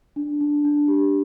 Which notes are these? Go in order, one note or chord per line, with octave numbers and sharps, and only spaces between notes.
D4
D4
D4
G4